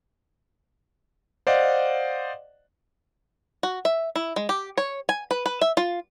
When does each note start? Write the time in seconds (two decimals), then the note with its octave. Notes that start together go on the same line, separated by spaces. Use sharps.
1.47 C5 D5 D#5 F5 F#5
3.63 F#4
3.85 E5
4.16 E4
4.36 G#3
4.49 G4
4.78 C#5
5.09 G#5
5.31 B4
5.46 B4
5.61 E5
5.77 F4